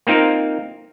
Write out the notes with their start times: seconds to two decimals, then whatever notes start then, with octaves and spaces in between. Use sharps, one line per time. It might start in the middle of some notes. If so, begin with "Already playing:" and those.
0.07 A#3 C4 D#4 F4 A#4